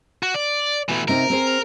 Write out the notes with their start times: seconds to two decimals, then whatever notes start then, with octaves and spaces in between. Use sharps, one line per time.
0.23 F#4
0.34 D5
0.89 B2 E3 A3
1.08 C3 C4 D#4 A#4
1.30 C4 G#4 C5